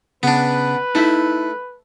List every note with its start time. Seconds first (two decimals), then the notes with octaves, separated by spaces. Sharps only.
0.23 C#3 B3 D4 B4
0.95 A3 D#4 E4 E5